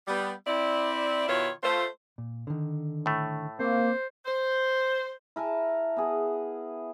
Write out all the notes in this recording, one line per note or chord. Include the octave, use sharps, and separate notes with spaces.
G3 B3
C4 E4 D5
B2 D#3 E4 F4 B4 C#5
A3 F4 C5
A#2
D3 D#3
A2 A3
A#3 C4 C5
C5
E4 A#4 G#5 A5
B3 G#4